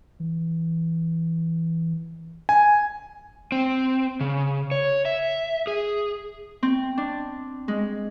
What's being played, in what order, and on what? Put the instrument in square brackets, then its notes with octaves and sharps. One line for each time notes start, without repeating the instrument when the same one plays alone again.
[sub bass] E3
[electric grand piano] G#5
[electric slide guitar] C4
C#3
C#5
E5
G#4
[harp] C4
D4
G#3